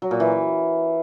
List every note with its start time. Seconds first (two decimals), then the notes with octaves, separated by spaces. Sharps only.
0.02 F#3
0.11 A#2
0.20 E3